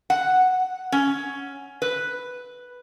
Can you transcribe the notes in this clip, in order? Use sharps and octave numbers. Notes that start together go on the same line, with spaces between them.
F#5
C#4
B4